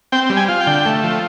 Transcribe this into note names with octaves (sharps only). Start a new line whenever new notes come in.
C4 G5
G3
G#5
F4
G5
D3
A3
F3